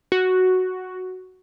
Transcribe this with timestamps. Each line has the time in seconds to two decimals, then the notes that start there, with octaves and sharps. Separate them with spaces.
0.12 F#4